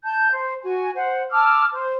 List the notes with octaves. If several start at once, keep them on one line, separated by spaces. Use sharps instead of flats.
A5 G6
C5
F#4 G#5
C5 F#5
A5 D6 E6 F6
C5